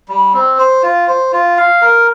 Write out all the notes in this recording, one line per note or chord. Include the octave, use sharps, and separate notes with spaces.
G3
C4
C5
F4
C5
F4
F5
A#4